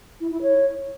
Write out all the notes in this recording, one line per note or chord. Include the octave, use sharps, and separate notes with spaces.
E4
E4
C#5